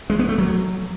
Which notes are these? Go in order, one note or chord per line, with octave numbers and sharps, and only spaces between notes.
G#3
B3
A3
F#3